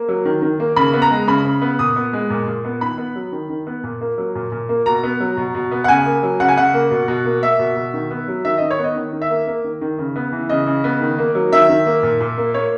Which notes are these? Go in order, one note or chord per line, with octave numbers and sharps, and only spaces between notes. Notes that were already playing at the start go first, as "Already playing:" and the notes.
Already playing: A#3
F#3
D#3
D#3
A#3
C#3 B5
B3
A#5
G#3
C#3 B5
C#3
B3
A#2 D#6
B3
G#3
A#2
A#2
B3
D#3 B5
B3
F#3
D#3
D#3
B3
A#2
A#3
F#3
A#2
A#2
A#3
B2 A#5
B3
F#3
B2
B2
B3
F#5
C#3 G#5
A#3
F#3
C#3 F#5
G#5
C#3 F#5
A#3
B2
B2
A#3
A#3 E5
B2
B2
D#3
B3
F#3
D#3 E5
D#3 D#5
C#5
B3 D#5
D#3
D#3
E5
A#3
A#3
D#3
D#3
C#3
B3
E3
C#3 D#5
C#3
B3
D#3
A#3
F#3
D#3 E5
D#3
A#3
A#2
A#2
A#3
A#3 C#5